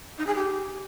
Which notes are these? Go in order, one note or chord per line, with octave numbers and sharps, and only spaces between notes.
D#4
G#4
G4